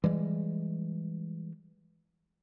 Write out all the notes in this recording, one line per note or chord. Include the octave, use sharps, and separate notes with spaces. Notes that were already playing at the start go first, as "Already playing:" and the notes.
E3 G3 G#3